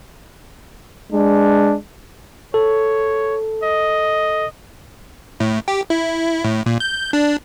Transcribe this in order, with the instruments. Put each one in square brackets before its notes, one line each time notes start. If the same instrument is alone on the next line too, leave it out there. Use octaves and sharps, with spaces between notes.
[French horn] G#3 [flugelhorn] D4
[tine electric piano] A4 [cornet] C#5
[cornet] D#5
[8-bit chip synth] A2
G4
E4
A2
A#2
G6
D4